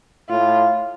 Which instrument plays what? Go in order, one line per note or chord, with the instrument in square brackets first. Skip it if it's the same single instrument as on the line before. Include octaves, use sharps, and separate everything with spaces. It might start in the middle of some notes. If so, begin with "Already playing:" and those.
[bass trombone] A2 [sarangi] F4